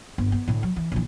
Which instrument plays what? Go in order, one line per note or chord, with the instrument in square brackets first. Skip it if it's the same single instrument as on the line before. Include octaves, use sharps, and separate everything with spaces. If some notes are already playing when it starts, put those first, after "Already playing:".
[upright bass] G1
B3
A2 D3
F#3
E3
A#1 E3